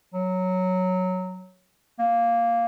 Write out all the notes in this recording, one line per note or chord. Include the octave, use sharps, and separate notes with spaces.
F#3
A#3